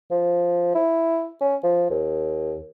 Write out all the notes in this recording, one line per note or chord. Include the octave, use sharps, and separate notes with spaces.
F3
E4
C#4
F3
D#2